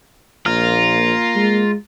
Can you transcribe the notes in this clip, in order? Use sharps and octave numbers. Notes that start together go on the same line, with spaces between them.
A#1 A#3 F4 A#5 F6
G#3